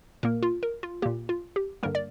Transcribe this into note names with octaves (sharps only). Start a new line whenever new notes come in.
A#2 A#3 A#4
F4
A#4
F4
A#2 A#3 G4
F4
G4
G2 D3 G3 A#3 A#4
D5